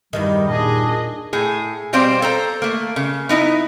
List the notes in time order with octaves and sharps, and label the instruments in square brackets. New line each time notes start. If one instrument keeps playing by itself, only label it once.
[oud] E2 G2 D#3 [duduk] G3 [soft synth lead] D#5
[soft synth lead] A#2 [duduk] D4 [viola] G#4 D#5
[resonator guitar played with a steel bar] A2 G#4
B2 G3 C4 C5 D5 F5
A4 C5 A#5
A3 A#3
C#3
B3 D#4 E4